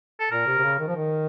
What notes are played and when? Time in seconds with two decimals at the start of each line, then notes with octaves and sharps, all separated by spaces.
0.20 A4
0.31 A#2 A#4
0.47 C3
0.58 C3
0.63 C#3
0.79 D#3
0.88 F3
0.96 D#3